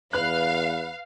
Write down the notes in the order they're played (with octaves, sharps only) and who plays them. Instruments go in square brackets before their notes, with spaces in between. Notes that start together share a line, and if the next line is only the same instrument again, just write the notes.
[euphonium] E2 [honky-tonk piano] B4 F#6 [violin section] F5